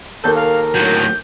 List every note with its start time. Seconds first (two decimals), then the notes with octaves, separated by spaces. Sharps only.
0.24 D#2 A4 A#4 G6
0.35 F5
0.75 A2 F#3 G6